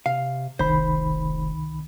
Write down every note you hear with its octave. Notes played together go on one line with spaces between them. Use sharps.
C3 F5
F1 C2 D#3 C5 B5